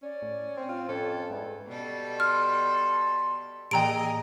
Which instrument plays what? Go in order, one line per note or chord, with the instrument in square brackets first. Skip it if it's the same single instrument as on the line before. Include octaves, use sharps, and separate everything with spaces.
[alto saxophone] C#4 [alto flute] D5
[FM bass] A2
[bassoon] C4
[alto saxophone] F4 [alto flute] G5
[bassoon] F2 [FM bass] C#4 [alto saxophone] A4
[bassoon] E2 [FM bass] G#2
[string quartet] B2 G3 A4
[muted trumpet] C6 [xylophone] F6
[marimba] A2 E3 [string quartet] A#3 G#4 D#5 [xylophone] G5 A#5 D7